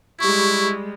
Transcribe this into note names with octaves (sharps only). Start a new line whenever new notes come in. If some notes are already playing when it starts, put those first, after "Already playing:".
G3 G#3 E4 G4 C#6